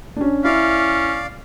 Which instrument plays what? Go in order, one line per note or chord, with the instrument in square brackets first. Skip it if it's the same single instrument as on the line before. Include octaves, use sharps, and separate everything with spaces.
[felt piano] C#4 D4
[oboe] C#4 [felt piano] E4 [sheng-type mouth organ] D5 F5